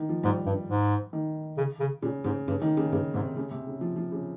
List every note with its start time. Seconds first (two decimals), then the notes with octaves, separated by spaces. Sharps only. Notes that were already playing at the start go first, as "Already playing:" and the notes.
Already playing: D#3
0.09 F3
0.23 G#2 G3
0.46 G2
0.69 G#2
1.13 D#3
1.57 C#3
1.80 C#3
2.02 A#2 C#3
2.24 G#2 C#3
2.48 G2 C#3
2.62 D#3
2.77 C#3
2.92 G2 C#3
3.14 G#2 C3
3.37 C#3
3.51 C3
3.67 C#3
3.81 F3
3.96 F3
4.12 C#3